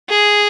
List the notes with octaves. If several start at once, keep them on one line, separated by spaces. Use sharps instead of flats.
G#4